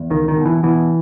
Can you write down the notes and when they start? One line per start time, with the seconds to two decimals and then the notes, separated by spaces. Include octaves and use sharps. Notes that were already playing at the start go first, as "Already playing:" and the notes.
Already playing: E2
0.10 C#2 D#3
0.28 D#3
0.37 B2
0.45 E3
0.63 B2 E3